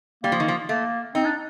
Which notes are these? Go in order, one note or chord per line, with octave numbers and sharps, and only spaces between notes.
G3 A#3
F3
D#3
F3
A3 A#3
C4 D#4
D4